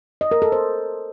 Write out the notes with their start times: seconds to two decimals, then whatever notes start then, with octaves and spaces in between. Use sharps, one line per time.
0.21 D#5
0.31 A#4
0.42 A4
0.52 C5